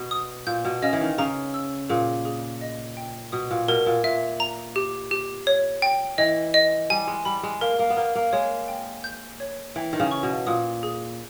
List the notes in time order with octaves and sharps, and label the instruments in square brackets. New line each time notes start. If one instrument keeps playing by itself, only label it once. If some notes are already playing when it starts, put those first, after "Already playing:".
Already playing: [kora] B2
[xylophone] D#6
[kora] A#2 [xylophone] G6
[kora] B2
[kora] C#3 [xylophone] D#5
[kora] E3
D#3
[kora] C#3 [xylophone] A#5
[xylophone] E6
[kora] A#2 [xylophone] G#4
[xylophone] G#4
D#5
G5
[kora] B2 [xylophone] D#6
[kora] A#2
[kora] B2 [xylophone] A#4
[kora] A#2
[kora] A#2 [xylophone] E5
[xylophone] A#5
G4
G4
C#5
G5
[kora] E3 [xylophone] D#5
[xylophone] D#5
[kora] G3 [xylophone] G#5
[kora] G#3
[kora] G3 [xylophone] B5
[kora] G#3
[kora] A#3 [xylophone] A#4
[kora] A#3
B3
[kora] A#3 [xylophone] A#4
[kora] A#3
[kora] G#3 [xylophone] C#5
[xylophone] G5
G6
C#5
[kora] E3 [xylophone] G5
[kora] D#3
C#3
[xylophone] C#6
[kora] B2
[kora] A#2 [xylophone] D#6
[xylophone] G#4